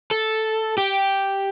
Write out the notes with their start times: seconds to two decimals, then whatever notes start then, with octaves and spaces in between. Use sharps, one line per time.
0.11 A4
0.78 G4